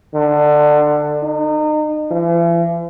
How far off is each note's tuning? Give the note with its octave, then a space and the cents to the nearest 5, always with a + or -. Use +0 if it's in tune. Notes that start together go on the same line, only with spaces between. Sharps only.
D3 +20
D#4 -35
E3 +45